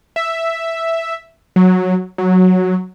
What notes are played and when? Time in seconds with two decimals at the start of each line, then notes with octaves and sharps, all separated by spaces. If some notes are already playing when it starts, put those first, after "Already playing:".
0.16 E5
1.56 F#3
2.18 F#3